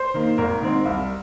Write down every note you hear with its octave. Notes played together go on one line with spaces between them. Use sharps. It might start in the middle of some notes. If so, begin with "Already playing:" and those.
Already playing: C5
D#3 A#3
G#1 A#4
G#2 D#3 C4
C2